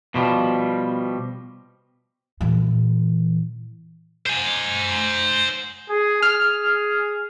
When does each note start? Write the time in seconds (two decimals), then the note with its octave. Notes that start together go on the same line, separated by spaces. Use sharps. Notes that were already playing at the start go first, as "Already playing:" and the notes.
0.15 B2 F3 G3
2.41 A#2 E3
4.26 C5 G#5
5.89 G#4
6.23 G#4 F6